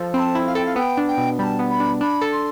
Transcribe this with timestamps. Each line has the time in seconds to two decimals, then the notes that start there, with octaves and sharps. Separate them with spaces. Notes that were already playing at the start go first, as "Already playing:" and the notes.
Already playing: F3 A4
0.14 C4 B5
0.19 A5
0.35 E4
0.46 F5
0.55 A4 G5
0.65 F5
0.76 B3 G5
0.97 D4
1.07 G5
1.18 B2
1.38 G3 A5 B5
1.59 B3
1.69 B5
1.80 D4
2.01 D4 B5
2.21 A4
2.32 C6